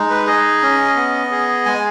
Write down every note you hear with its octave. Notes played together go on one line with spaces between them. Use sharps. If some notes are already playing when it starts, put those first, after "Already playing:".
Already playing: G#3 D#4
B4
G#4 D#5
C#4
B3
G#4
G#3 G#5